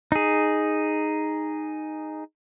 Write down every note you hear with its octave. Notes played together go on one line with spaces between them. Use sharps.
D#4 G#4